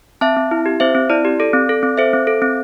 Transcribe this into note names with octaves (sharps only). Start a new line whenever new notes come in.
C4 E5 A5
C4
E4
G4
C4 C5 E5
C4
E4 D5
G4
A4 D5
C4
A4
C4
A4 C5 E5
C4
A4
C4